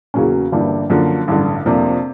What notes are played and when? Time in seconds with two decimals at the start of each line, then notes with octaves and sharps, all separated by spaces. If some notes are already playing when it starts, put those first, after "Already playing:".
0.14 E2 C#3 F#3 A#3 C#4
0.52 G1 G2 E3 G3 A#3
0.90 F#2 D3 F3 A#3
1.28 A1 G2 D3
1.66 F2 C3 F3 A#3 D4